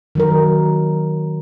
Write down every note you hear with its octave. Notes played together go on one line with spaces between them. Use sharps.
D#3 F#3 A#4